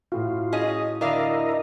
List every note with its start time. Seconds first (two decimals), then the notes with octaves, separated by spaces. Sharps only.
0.12 A2 F4 F#4
0.52 C#4 G#4 D#5
1.01 D3 E4 A#4 D5 D#5 F5